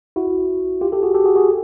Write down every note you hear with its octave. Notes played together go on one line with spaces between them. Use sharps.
E4 F#4
F4 G4
G4 A4
F#4 G#4
G4 A4
F#4 G#4
F#4 G#4